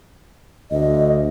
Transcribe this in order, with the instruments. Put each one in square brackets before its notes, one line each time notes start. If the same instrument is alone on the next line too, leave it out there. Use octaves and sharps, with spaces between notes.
[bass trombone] D2 [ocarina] D#5